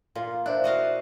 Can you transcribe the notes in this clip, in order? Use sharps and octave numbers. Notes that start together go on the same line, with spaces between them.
A#2 F4
D4 E4 C5 D5 F#6
F#4 D#5 F5